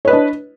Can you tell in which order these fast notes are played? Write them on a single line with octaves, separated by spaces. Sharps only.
C#5 B4 D#5 D4